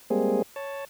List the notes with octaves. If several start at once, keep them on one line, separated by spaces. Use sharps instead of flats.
G3 G#3 A#3 C4 G#4
C#5 A5